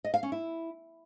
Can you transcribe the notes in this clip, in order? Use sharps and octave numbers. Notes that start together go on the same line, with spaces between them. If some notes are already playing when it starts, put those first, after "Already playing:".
D#5
F5
C#4
E4